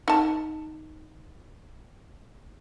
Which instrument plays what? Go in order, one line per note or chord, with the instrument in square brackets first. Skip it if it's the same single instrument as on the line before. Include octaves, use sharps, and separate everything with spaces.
[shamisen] D#4 A5